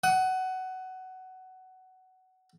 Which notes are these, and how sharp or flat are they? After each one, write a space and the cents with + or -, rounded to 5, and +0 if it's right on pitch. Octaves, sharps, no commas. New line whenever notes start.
F#5 +15 D#6 +30